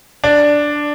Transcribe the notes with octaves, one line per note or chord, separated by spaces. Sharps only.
D4